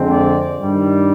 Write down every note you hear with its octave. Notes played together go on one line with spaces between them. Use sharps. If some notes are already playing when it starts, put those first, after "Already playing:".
Already playing: F2 D3 G#3 C4
D5
G2 D#3 G3